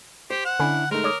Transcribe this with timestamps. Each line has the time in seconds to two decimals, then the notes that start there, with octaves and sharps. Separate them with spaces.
0.30 G4 C5
0.45 F#5 E7
0.60 D3 C#4 D4 E4 G#5 B5
0.91 G#3 A3 D#4 A#4
1.04 C#5 D6 D#6